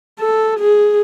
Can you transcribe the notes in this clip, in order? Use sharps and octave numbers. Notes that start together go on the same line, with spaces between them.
A4
G#4